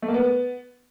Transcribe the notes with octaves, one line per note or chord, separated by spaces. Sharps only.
A3
A#3
B3